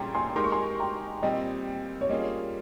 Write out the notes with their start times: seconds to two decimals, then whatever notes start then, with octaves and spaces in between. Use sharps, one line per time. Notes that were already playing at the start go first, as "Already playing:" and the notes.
Already playing: A#2 G3 C#4 G#4 G5 A#5 C6
0.15 G#5 C6
0.36 G#3 D#4 G4 A#4 C6
0.44 C#6
0.52 G#5 C6
0.79 G5 A#5
1.22 A#2 G3 C4 D#5 G5
2.01 C#5
2.09 G3 A#3 C#4 F4 G#4 D#5